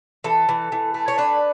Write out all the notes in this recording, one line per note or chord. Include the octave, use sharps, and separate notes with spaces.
E3 A4
E3
E3
A3
C#5
D4 B4